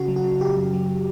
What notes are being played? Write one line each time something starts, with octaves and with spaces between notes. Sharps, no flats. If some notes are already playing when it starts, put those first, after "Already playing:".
Already playing: C#3 F#4
F#3
F#4
C#3
C#3 G4
F#2
F#3